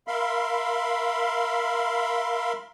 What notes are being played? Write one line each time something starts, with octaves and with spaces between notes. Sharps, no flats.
A#4 E5 F5 B5 C6